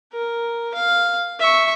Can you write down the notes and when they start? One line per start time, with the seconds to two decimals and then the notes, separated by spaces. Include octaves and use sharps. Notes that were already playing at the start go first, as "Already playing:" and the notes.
0.13 A#4
0.74 F5
1.40 E5 C#6